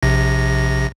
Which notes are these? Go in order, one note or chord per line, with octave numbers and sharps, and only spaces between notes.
A#1 C3 A#6